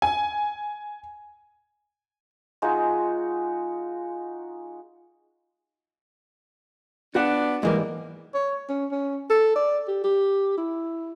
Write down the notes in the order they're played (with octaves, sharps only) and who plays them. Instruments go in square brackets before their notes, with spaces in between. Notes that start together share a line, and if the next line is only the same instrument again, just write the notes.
[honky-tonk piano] G#5
[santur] G#3 D#4 F4 F#4
[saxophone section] B3 D4 [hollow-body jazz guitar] F#4 F#5
[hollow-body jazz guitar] G#2 E3 G3 [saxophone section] G#3 A#3
[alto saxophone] C#5
C#4
C#4
A4
D5
G4
G4
E4